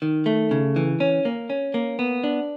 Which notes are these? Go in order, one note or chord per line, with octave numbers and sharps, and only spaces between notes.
D#3
A3
C#3
E3
C#4
A#3
C#4
A#3
B3
D4